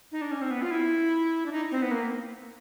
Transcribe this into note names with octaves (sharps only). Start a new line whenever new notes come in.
D#4
D4
C#4
C4
B3
F4
E4
D4
D#4
C4
B3
A#3